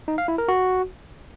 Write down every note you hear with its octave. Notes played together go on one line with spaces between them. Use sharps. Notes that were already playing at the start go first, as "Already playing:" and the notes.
D#4
F5
E4
A#4
F#4